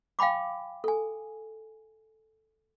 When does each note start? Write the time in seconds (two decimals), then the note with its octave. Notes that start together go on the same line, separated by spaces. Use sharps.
0.19 F5 G5 G#5 B5 D6
0.84 A4 G#5